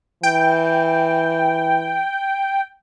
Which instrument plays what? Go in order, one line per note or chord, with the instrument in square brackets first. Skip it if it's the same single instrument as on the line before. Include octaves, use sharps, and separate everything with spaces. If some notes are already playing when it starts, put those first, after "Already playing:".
[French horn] E3 [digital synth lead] G5